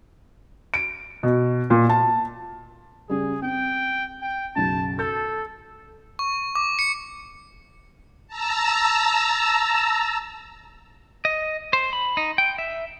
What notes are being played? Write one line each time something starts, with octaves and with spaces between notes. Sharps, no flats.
D7
B2
A#2
A5
C#3 G3 G#4
C4 G5
G5
B1 F#2 C#3 A5
A4 G6
C#6
D6
C#7
A5 A#5 E6
D#5
C5
B5
D#4
G5
E5